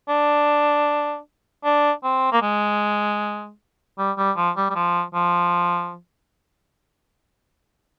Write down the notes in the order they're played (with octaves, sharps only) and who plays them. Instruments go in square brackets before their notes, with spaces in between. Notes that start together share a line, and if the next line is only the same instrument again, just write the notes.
[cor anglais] D4
D4
C4
A#3
G#3
G3
G3
F3
G3
G3
F3
F3